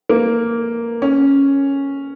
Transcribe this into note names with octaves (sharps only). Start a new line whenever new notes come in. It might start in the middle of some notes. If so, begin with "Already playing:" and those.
A#3
C#4